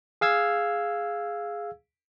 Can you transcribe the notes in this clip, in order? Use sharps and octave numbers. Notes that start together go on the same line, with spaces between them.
G#4 F5 E6 G#6